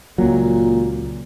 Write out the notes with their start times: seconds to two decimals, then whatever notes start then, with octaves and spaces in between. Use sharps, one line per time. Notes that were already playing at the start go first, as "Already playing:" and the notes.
0.18 C#2 A#2 F#3